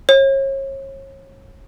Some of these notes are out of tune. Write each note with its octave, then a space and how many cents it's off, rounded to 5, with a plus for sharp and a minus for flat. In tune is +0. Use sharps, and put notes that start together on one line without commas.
C#5 -35